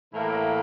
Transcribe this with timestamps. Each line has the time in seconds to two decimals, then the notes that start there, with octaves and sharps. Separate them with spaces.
0.13 A2 E3 A#3 E4 A#4